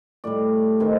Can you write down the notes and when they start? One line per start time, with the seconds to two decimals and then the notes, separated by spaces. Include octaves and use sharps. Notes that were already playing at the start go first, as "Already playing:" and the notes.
0.24 A2 G3 D5
0.80 C3 D#3 G3 C5